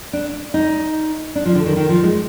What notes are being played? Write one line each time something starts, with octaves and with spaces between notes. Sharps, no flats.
D4
D#4
D4
F3
D3
D#3
D#3
F3
G#3